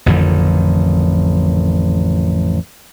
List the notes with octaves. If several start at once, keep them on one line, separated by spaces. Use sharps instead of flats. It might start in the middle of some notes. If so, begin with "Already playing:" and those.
A1 F2 D3 D#3